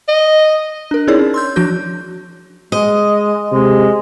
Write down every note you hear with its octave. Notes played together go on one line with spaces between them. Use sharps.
D#5
D4 A#4
C4 D#4 E4 G#4 C#5 D5
C#4
C6 E6 G6
F3 D4 F#4 G6
G#3 D#5
C3 G#3